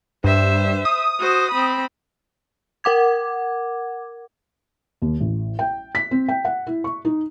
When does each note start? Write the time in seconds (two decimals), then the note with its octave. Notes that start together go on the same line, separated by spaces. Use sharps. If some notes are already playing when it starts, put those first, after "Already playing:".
0.24 G2 C5 E5
0.85 D#6
1.20 F#4 C5
1.52 C4 B5
2.84 A#4 F#5 D6 G#6
5.02 D#2
5.20 A1
5.59 G5
5.95 B6
6.11 C4
6.28 G5
6.45 F#5
6.67 E4
6.84 C#6
7.05 D#4